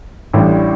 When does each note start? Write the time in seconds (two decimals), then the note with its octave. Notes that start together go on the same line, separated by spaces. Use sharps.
0.33 A1 A2 G3 D4